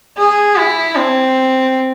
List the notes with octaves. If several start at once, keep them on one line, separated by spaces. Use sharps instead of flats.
G#4
E4
C4